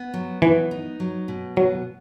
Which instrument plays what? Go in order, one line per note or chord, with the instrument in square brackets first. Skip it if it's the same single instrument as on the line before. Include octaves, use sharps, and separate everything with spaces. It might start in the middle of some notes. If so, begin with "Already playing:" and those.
Already playing: [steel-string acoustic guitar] B3
F#3
[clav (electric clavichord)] E3 [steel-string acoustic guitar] B3
[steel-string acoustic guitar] D#4
F#3
B2
[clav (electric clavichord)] F#3 [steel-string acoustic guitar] B3